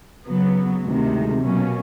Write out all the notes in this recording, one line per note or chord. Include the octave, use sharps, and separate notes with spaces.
C#3 F#3 B3
D2 C3 D#3 G#3
B2 F#3 A#3 C#4